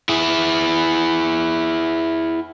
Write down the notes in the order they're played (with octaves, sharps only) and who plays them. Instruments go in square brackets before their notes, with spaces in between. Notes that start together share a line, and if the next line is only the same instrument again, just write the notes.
[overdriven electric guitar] E4 G#4